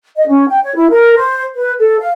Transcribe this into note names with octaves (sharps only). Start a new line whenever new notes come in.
D#5
C#4
G5
C#5
E4
A#4
C5
B4
A4
F5